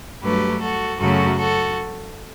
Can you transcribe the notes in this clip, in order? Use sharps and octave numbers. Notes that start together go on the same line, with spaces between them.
G2 F#3 A3 G4 B4
F#4 A4
F#2 C#3 F#3 A3 F#4 A4
F#4 A4